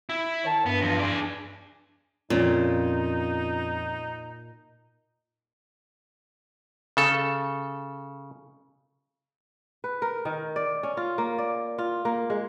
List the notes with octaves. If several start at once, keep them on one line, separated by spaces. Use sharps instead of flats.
E4
D#3 C#5 A5
G2 B3
E2 F3
G#4 D5
D4
F2 A#2 C#4 D#4 F4
C#3 A4
B4
A#4
D#3
D5
C#4
F4
A#3
D5
F4
A#3
G#3